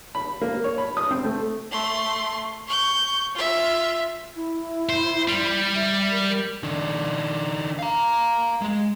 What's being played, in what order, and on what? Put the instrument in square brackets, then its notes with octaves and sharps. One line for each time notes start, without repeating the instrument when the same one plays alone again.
[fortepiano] B5
A#3
C#5
B5
D#6
C4
A3
[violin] A3 C6
C#6 G6
F4 E5
[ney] E4
[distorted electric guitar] C5
G3
[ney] E5
A#4
[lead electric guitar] D#3 D4
F5 A#5
G#3 G#4